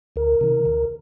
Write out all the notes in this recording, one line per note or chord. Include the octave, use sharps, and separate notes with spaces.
D2 A#4
C3 D#3
D2